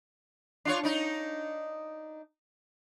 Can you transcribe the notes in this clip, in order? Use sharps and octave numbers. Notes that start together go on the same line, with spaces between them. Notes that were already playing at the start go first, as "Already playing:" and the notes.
D4 F4 C#5
D4 D#4